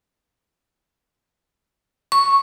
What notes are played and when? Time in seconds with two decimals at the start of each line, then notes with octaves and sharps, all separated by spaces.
2.12 C#6